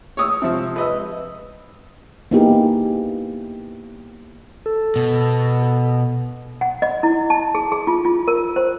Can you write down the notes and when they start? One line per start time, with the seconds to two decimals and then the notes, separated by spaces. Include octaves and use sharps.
0.17 C#5 D#6 E6
0.42 C3 F3
0.76 B4 D#5 E6
2.31 A#3 B3 D#4 E4 G4 G#4
4.66 A4
4.96 B2
6.61 F#5
6.82 D#5
7.03 E4
7.30 A5
7.55 G#4
7.72 G#4
7.87 F4
8.05 F4
8.28 A#4
8.56 C5